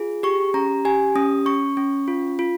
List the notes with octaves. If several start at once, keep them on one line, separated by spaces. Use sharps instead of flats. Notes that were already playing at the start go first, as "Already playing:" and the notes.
Already playing: F4 G#4
G4 C#6
C#4 A#5
G4 G#5
C#4 D#6
C#4 C#6
C#4
F4
F4